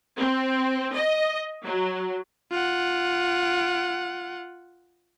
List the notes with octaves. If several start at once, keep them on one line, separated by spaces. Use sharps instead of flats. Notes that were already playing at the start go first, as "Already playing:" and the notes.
C4
D#5
F#3
F4 F#5